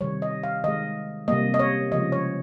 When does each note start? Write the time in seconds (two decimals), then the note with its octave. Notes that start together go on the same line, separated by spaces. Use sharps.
0.01 C3 D#3 G3 C#5
0.22 D#5
0.43 F5
0.64 D#3 G#3 D#5
1.28 C3 G3 A#3 D#5
1.54 D#5
1.59 C#5
1.92 C#3 F3 G#3 D#5
2.12 C#5